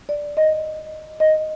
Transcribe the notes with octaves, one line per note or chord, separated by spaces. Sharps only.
D5
D#5
D#5